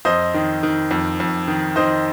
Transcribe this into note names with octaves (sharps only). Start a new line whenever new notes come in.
F2 C5 D#5
D#3
D#3
F2
F2
D#3
D#3 C5 D#5